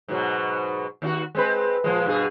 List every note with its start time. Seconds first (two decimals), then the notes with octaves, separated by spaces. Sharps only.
0.08 G#2 B2 F#3
1.02 D#2 D4 F#4
1.35 G#3 C4 B4
1.84 A#2 F3 G#3
2.06 G2 B2 G#4